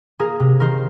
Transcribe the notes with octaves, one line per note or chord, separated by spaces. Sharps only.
A#3 G#4 A#4
C3
D#3 A#4 C5